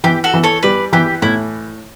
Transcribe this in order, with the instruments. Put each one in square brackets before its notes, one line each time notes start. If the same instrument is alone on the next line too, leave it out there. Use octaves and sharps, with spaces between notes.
[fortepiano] E3 [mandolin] G4
[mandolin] F#4 A4
[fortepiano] E3
[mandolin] A4 C#5
[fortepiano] G3 [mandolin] B4 D5
[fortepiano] E3 [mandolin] G4
[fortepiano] A2 [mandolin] E4